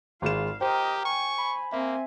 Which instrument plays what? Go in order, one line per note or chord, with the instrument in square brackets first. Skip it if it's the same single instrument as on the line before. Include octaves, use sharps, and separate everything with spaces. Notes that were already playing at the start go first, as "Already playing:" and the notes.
[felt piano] G#1 G#3 E7 [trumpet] F4 [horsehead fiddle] F5
[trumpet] G4 [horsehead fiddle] A#4 D#5 [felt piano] C5 [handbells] G5
[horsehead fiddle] G#5 [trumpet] C#6
[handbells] B5
[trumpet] A#3 [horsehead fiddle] C4 G#5 [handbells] E5